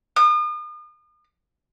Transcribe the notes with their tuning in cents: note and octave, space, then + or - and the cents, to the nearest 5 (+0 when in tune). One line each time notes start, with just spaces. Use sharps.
D#6 -40